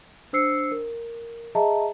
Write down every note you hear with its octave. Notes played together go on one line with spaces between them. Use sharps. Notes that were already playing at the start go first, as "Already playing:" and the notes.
D4 C5 E6 C7 C#7
A#4
G#4 D#5 E5 A5 A#5